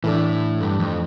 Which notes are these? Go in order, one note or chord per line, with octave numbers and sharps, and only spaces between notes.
A2 E3 A3 D4
G2
F2